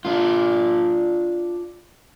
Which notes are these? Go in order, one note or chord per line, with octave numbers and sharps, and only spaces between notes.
D4 F4